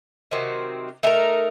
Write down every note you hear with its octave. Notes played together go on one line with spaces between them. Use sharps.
C3 D#3 F#3 C4
A3 D#4 G4 A#4